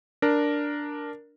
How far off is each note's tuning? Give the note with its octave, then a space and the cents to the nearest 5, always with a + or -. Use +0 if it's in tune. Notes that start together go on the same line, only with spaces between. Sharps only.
D4 +0 A#4 +0